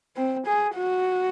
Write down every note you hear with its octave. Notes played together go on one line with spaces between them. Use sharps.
C4
G#4
F#4